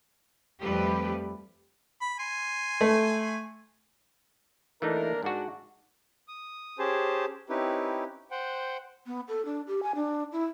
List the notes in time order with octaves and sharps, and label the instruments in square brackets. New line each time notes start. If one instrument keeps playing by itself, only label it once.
[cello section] F2 F3 G3 A3 G4 B4
[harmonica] B5
G#5 C6
[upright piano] A3
[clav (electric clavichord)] E3 A3 D#4 [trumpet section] A#3 D4 A#4
[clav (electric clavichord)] G#2 F#4 [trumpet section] D4 F#5
[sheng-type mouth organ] D#6
C#4 G4 G#4 C5 A5
C4 C#4 D#4 E4 G4 B4
C5 F#5 G5
[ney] B3
A4
D4
G4
G#5
D4
E4